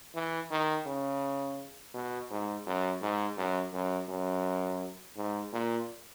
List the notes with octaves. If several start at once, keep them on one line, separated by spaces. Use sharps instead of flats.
E3
D#3
C#3
B2
G#2
F#2
G#2
F#2
F#2
F#2
G#2
A#2